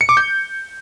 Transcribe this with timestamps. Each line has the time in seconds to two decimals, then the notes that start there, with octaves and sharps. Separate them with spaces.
0.01 C#7
0.09 D6
0.17 G6